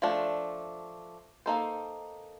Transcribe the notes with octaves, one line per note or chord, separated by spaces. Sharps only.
F3 A3 D4
A#3 D#4 A4 C5